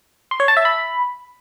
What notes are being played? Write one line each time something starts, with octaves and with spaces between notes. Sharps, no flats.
C6
C#5
A5
E5
B5